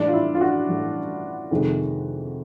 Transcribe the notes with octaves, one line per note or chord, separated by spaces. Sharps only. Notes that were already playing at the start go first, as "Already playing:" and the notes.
Already playing: A2 E3 G3 D4
F4
E4
F4
F#4
A2 E3 G3
F2 C3 D#3 G#3